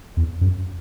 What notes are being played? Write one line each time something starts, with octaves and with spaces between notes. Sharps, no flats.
E2
F#2